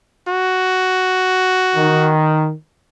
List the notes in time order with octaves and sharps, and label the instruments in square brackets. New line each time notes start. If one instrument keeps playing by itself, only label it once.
[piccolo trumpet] F#4
[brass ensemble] D#3